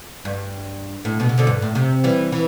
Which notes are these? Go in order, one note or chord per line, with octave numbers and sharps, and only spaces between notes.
G2
A2
B2
C3
B2 D3
G2
A2
C3
E3 G3
E3